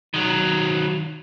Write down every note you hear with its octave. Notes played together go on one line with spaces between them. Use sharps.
D#3 F#3